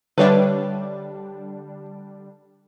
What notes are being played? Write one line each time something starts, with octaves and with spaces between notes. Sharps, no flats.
D3 G3 D4 B4 C#5 E5